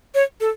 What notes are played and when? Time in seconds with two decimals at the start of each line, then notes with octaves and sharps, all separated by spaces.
0.15 C#5
0.40 A4